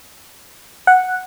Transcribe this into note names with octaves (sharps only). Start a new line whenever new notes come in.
F#5